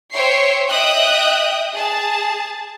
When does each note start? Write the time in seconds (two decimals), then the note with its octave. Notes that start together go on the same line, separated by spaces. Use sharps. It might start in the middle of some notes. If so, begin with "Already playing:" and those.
0.12 C5 C#5 E5 G5 C#6 C7
0.69 D#5 E5 G5 D#6 F#6 G6
1.75 G#4 A5